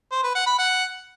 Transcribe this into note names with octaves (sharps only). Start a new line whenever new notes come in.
C5
B4
F#5
B5
F#5